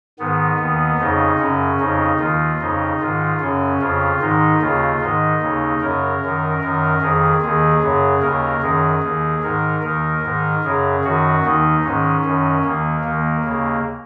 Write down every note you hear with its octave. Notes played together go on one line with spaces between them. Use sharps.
G#2 D#3 B3
D#2 D#3
F2 C#3 D#4
F#2 C#3 C#4
F2 C#3 D#4
D#2 D#3 F4
F2 C#3 D#4
G#2 D#3 F4
F#2 C#3 C#4
F2 C#3 F4
G#2 D#3 D#4
D#2 C#3 F4
G#2 D#3 D#4
D#2 C#3
F#2 C#3 A#4
F#2 D#3
F#2 D#3 A#4
F2 D#3 G#4
D#2 D#3 G#4
F#2 C#3
D#2 C#3 A#4
F#2 D#3 G#4
D#2 D#3
G#2 D#3 A#4
D#2 D#3 A#4
G#2 D#3
F#2 C#3 G#4
F#2 D#3 F#4
D#2 D#3 D#4
G#2 D#3 C#4
F#2 D#3
D#2 D#3 A#3
D#2 D#3 A#3
D#2 C#3